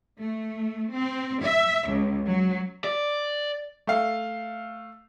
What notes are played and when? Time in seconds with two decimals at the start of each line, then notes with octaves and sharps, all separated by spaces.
0.20 A3
0.95 C4
1.45 E5
1.90 C#2
2.29 F#3
2.84 D5
3.87 A3 F5 C7